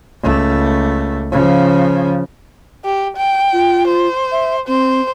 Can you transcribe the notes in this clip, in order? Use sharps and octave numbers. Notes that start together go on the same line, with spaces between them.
C#2 A3
C#3 F3
G4
G5
F4
C5
E5
C4 C5